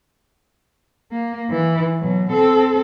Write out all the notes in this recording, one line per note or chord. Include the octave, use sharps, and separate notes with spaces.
A#3
E3
B2 F#3
C4 A4